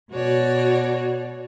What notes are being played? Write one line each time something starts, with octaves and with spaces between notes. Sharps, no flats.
B2 F#4 C#5 D5